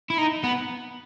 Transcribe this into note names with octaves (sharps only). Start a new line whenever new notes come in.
E4
D#4
B3